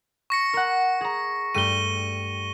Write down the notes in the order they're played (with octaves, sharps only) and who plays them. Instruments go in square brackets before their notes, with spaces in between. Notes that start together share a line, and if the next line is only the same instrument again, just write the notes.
[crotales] C#6 A#6 C#7
[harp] A#4 F#5
G#4 A#5
[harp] G2 G3 A3 [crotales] D#7 G7